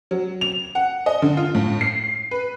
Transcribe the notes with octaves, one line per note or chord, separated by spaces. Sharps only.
F#3
F7
F#5
D#5
D3
F4
A2
C7
B4